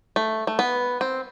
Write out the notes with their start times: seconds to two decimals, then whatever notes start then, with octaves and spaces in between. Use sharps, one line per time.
0.16 A3
0.47 A3
0.59 B3
1.01 C4